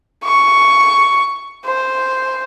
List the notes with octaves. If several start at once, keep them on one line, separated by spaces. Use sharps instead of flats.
C#6
C5